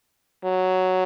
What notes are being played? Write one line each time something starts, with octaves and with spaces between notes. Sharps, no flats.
F#3